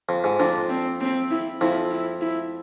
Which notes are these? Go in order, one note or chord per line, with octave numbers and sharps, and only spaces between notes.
F2
G#2
F2 D4
C4
C4
E4
F2 E4
E4
E4